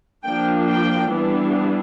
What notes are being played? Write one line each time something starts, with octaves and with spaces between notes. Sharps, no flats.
F3 A#3 D4 G5
G5
E3 G3 B3 D4